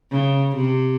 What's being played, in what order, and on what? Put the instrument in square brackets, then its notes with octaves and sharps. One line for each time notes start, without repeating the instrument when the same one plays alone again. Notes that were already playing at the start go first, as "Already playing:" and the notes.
[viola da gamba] C#3
C3